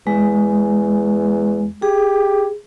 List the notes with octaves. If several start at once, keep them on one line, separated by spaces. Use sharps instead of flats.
E2 G#3
G4 G#4